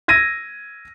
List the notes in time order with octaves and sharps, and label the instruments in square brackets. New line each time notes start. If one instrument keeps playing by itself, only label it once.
[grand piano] E6 G#6 A#6 D#7